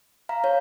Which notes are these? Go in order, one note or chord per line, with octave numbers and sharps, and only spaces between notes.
F5 A#5
C#5 F5